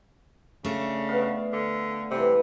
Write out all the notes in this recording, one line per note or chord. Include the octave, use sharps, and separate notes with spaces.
C#3 A3 D4
B3 F5
D3
C3 E3 G3